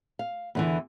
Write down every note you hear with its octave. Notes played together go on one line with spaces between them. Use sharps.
F5
E2 D3 E3